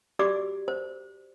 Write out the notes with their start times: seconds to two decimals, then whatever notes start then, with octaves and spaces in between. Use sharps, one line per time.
0.19 F#4 G4 D5 D6
0.68 C5